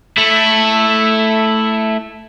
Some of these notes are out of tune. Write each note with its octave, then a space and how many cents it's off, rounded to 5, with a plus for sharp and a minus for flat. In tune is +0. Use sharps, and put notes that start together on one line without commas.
A3 +0 E4 +0